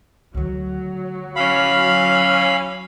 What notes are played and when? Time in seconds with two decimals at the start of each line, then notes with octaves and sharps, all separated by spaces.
0.35 D2 D#3 F#3
1.36 E3 C#4 F5 B5